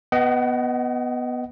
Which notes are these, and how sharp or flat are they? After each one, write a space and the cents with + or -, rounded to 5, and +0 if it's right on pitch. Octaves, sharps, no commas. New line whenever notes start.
B3 +0 D#5 +0 F#5 +45